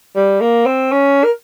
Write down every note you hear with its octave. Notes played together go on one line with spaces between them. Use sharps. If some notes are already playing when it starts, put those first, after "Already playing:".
G3
A#3
C4
C#4
A#4